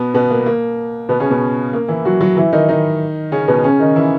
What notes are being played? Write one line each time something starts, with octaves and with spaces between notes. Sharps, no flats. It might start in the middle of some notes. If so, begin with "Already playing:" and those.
Already playing: B2 B3
B2 B3
A#3
A#3
B2 B3
C#3 C#4
B2 B3
A#3
E3 E4
F#3 F#4
F#3 F#4
E3 E4
D#3 D#4
D#3 D#4
C#3 C#4
B2 B3
C#3 C#4
D#3 D#4
E3 E4